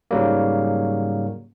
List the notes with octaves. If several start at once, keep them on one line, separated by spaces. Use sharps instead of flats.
G#2 C#3 F#3 G3 A#3